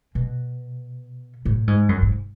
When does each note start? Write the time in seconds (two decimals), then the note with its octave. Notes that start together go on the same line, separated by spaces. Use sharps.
0.15 B2
1.45 A2
1.67 G#2
1.89 F#2
2.02 G#2